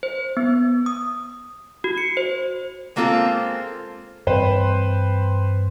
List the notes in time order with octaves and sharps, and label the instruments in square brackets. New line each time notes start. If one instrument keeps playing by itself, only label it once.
[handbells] C5
B3
D#6
F#4
C#7
C5
[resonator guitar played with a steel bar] G#3 A#3 C4 F4 A4 C5
[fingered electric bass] G2 E3 C4 [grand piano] B4 C5 G5